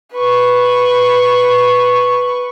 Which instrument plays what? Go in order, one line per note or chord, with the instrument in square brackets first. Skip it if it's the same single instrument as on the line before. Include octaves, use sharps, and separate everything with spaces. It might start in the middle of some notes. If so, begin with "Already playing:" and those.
[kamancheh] B4 C#6